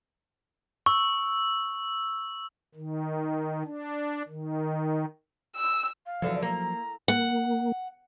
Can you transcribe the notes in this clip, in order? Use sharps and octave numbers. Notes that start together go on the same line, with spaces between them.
C#6 E6
D#3
D4
D#3
E6
F5
E2 D3 F3 F#3
A#3 A#5
A#3 F#5